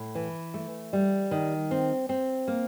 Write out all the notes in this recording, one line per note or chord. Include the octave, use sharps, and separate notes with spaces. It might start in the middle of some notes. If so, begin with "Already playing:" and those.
Already playing: A2
E3
A3
G3
D#3
C4
C4
A#3